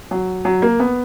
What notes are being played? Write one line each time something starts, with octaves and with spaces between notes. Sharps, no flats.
F#3
F#3
A#3
B3